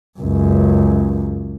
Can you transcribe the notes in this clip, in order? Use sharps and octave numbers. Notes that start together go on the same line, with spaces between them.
C#2 F#2